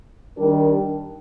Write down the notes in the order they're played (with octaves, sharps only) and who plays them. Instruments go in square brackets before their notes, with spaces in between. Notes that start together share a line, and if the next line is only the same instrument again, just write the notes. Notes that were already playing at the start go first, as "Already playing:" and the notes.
[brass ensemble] D#3 G3 D4 G4 A#4